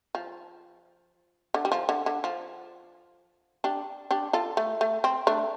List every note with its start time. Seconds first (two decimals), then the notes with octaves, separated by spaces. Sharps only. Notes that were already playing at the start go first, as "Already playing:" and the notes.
0.15 F3
1.54 D3
1.65 G3
1.72 F3
1.89 D3
2.06 D3
2.24 F3
3.64 D4 G4
4.11 D4 G4
4.33 F4 A4
4.57 A3
4.81 A3
5.04 C4
5.27 A3 D4